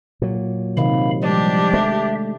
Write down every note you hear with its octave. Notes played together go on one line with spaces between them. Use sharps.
A#2 F#3
C3 D#3 F5 B5
F3 G3 G#3 D4 G4
G#3 A3 E5